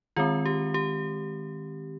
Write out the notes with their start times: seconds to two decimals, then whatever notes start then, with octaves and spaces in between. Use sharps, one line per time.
0.16 D#3 G#3 C4 F4
0.46 G4
0.74 G4